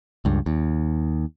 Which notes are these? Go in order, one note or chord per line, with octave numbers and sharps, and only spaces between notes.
C#2 G2
D#2